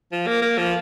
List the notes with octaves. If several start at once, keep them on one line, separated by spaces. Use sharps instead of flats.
F3
A#3
A#3
F3